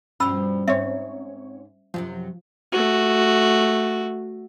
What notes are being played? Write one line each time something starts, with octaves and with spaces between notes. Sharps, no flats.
G2 B2 F3 C#4 B5 E6
G#2 C4 C#4 C#5 E5
F#2 C3 F3 F#3
A3 F#4